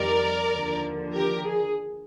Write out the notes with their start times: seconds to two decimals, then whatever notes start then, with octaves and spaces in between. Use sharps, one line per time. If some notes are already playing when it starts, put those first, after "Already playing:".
Already playing: F2 D#3 G3 A#4 D5
0.52 D#2 D3 F3
1.14 G4 A#4
1.46 G#4